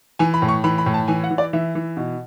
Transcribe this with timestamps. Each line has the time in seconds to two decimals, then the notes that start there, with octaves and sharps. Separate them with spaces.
0.19 E3 G#5
0.34 B5
0.42 A2
0.49 C#6
0.64 E3 B5
0.78 B5
0.86 A2
0.94 A5
1.08 E3 G#5
1.24 F#5
1.31 E3
1.38 D5
1.53 E3 E5
1.75 E3
1.97 B2